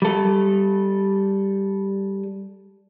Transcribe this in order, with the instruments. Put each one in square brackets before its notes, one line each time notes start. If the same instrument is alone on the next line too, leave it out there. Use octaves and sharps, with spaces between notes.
[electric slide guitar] G3 A4